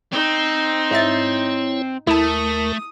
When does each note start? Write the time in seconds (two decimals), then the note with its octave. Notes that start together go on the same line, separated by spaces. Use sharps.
0.12 C4 D#4
0.91 G#2 E4 C#5 E5 A6
2.07 D#2 A3 E4 A#4 A5 D#6